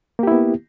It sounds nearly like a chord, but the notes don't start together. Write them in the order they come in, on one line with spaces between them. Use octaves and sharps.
A#3 G4 E4 B3